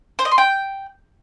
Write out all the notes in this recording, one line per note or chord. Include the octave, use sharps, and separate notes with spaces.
C5
D#5
C6
G5